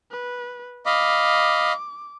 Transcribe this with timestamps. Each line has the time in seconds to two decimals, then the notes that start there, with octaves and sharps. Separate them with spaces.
0.11 B4
0.86 D#5 F5 B5 D6